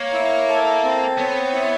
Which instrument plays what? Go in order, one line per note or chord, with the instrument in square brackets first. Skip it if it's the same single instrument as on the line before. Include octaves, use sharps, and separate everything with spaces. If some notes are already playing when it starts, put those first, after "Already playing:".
Already playing: [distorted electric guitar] A#3 [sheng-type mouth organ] C#5
[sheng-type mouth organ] E4
A4
C4
[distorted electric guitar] B3 [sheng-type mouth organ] C#5
[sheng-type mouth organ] E4